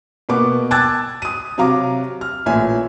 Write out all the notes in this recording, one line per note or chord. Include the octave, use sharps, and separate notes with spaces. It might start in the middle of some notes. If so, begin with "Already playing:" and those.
B2 A#3 B3 D6
A5 D6 E6 F#6 G#6 A6
D#6 D#7
C3 F#3 F5 A#5 D6
F6
A1 A#2 E5 G#5